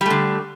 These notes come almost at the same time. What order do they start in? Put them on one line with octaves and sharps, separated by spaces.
G3 A3 D3